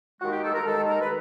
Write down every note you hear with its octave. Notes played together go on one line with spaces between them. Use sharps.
D#2 D#3 G#3 F#4
G4
A4
A#4
D#2 D#3 G#3 A4
A#4
B4